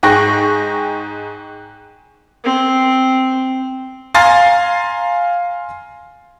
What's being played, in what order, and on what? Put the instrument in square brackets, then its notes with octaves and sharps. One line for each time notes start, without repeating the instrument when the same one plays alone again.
[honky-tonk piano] G#2 G#4 G5 C#6 F#6 A#6
[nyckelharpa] C4
[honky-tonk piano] F5 G#5 A#5 C6 F6 A6